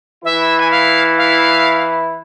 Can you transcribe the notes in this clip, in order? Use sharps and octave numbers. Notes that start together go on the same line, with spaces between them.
E3 E4 E5
G#5
F5
F5